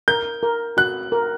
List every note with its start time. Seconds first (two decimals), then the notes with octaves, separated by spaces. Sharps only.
0.08 A#4 G6
0.43 A#4
0.77 F#4 F#6
1.12 A#4